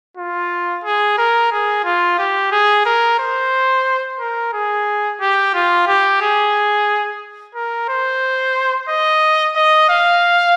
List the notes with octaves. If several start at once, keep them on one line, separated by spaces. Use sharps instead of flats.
F4
G#4
A#4
G#4
F4
G4
G#4
A#4
C5
A#4
G#4
G4
F4
G4
G#4
A#4
C5
D#5
D#5
F5